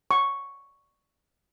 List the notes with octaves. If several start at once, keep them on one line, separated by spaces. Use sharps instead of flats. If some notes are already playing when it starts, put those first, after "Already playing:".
C#6